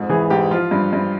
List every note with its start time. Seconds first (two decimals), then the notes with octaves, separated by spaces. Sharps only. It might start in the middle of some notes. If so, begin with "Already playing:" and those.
Already playing: F2 G#2
0.10 E3 G#4
0.30 G#2 G4
0.51 F3 F4
0.71 G2
0.93 G2